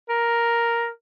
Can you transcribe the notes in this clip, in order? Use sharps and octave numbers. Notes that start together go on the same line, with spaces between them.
A#4